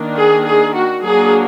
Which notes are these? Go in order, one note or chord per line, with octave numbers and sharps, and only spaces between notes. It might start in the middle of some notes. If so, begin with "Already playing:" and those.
Already playing: D#3 A#3 D4
G#4
G#4
F#4
F#3 A#3 D4 G#4